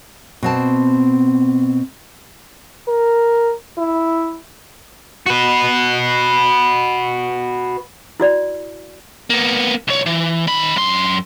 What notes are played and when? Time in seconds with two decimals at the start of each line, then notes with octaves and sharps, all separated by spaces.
0.43 B2 C4 A5
2.88 A#4
3.78 E4
5.26 F#4 B4
8.20 E4 F#4 D5
9.30 A#3 B3
9.88 C2 C#5
10.06 E3
10.47 D#3 B5
10.76 F#2 C6